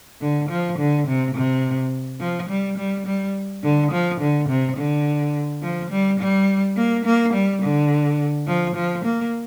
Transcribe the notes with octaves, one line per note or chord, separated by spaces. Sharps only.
D3
F3
D3
C3
C3
F3
G3
G3
G3
D3
F3
D3
C3
D3
F3
G3
G3
A#3
A#3
G3
D3
F3
F3
A#3